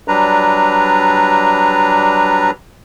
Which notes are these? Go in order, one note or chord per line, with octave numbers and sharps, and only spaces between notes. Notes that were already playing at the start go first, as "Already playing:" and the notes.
F#3 G3 D4 B4 A#5